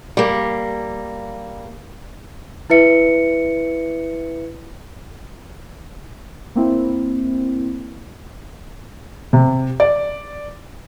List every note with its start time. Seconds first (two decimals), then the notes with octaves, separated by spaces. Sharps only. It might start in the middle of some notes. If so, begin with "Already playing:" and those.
0.17 G3 A#3
2.70 E4 B4 E5 C#7
6.55 A#3 C4 E4
9.33 C3
9.80 D5